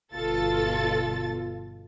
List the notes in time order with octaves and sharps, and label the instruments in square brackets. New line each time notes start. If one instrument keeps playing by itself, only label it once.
[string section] G1 B2 F4 A4 A6